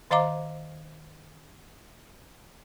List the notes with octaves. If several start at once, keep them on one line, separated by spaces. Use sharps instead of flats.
D#3 C5 D#5 F5 A#5 D6